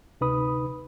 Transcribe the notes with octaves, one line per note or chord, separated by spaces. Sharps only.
D2 C3 D#4 B4 B5 D#6